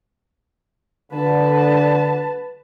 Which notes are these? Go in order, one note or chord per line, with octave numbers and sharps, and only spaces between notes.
D3 B4 A5